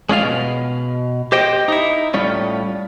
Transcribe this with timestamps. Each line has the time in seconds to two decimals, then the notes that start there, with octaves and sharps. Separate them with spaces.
0.09 G#3 C#4 F4 F5
0.22 B2
1.32 G4 C5 D#5 G5
1.68 D#4 E4
2.14 A2 G3 C#4 F4